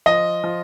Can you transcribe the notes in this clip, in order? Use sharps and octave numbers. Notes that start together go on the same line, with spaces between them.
F3 D#5
F3